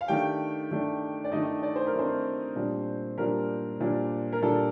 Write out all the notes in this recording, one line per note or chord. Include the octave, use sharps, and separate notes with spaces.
F5
D#3 A3 D4 G4 G5
D#3 A3 D4
D5
D#3 A3 D4 D#4 D#5
D5
C5
A#4
D#3 A3 C4 D4 C5
A#2 G3 D4
A#2 G3 D4 A#4
A#2 G3 D4
A#4
A#2 G3 D4 A4